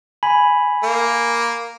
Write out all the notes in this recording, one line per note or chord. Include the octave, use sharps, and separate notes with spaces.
G#5 B5
A#3